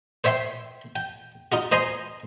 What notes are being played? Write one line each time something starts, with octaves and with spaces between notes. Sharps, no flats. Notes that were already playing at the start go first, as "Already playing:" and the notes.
C5 C#5 E5 G5 C6
G5
D#4 F4 F#4
C5 D#5 G#5 A#5 C6